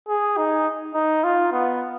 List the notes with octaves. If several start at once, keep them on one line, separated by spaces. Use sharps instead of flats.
G#4
D#4
D#4
F4
B3